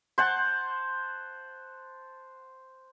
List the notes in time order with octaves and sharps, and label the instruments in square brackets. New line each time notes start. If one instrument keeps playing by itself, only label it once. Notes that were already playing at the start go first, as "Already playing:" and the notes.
[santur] C5 F#5 A5